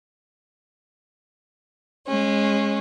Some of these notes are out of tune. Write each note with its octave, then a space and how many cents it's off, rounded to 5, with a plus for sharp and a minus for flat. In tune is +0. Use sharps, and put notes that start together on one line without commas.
G#3 +0 C#4 -25